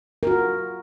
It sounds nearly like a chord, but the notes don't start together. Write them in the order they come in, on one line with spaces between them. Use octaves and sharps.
A#4 F#4 F4